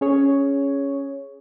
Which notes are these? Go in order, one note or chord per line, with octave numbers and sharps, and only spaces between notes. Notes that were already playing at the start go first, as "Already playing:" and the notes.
C#4 G#4 C#5